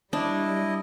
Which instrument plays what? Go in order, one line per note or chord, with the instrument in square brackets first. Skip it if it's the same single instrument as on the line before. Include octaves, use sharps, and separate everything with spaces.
[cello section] G3 [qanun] D4 [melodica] E4 D#5